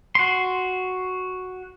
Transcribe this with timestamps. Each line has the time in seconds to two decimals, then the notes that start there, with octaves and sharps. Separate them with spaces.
0.15 F#4 C6